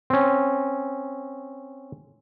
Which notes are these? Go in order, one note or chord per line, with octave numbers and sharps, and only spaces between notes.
C4 C#4